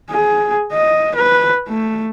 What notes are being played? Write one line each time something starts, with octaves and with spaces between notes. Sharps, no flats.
G#4
D#5
B4
A3